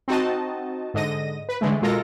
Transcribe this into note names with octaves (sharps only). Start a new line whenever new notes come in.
C4 D#4 F#4 D#5 A5
G#2 D3 D#5 A#6 D#7
B4
D3 E3 G#3 A3
B2 G#3 F4 A4 A#4 A#6